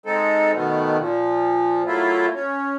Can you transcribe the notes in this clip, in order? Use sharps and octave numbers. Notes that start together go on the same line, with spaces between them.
G#3 C4 D#4 A4
B2 D#3 A3 B3
A#2 F3
F#3 A3 A#3 E4 F4
C#4